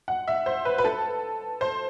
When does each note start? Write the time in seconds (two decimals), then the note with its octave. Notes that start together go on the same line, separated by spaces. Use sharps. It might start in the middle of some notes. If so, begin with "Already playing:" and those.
0.08 F#5
0.28 E5
0.46 C5
0.65 B4
0.78 B4
0.85 A4
1.61 C5